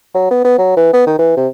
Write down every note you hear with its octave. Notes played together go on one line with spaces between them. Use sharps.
F#3
B3
B3
F#3
E3
B3
D#3
E3
C3